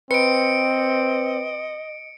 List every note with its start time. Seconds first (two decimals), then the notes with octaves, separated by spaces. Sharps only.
0.11 C4 B4 D#5 C#7 D7